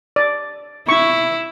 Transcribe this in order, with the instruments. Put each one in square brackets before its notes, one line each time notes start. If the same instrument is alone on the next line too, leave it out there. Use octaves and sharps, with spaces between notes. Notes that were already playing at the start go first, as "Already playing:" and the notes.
[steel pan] D5
[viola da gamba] E4 [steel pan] C#6